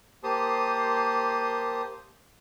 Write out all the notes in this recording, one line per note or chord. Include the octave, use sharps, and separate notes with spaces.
A#3 G4 C5 A5 C6 D#6